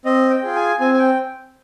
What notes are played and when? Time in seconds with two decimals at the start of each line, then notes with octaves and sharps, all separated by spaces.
0.05 C4 D#5
0.30 G5
0.43 F4 G#4
0.56 G#5
0.80 C4 G#5
0.94 G#5
0.98 G5